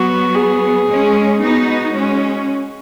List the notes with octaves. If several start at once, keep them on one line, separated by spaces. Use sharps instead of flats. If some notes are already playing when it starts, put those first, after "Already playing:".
Already playing: F#3 B3 F#4
G#4
G#3 C#4
B3 D#4 F#4
G#3 C#4